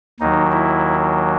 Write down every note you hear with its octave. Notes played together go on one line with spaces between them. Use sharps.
D#2 D#3 F#3 D#4
E4